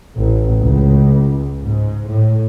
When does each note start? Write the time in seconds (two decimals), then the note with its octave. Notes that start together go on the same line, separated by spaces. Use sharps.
0.17 A1
0.61 C#2
1.64 G#2
2.10 A2